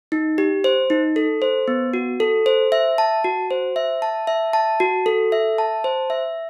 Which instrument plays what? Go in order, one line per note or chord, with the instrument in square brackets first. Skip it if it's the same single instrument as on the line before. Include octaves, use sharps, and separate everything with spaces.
[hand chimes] D#4
G4
C5
D#4
A4
C5
B3
F#4
A4
C5
E5
A5
F#4
C5
E5
A5
E5
A5
F#4
A4
E5
A5
C5
E5